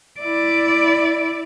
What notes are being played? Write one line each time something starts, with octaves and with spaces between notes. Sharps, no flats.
E4 D5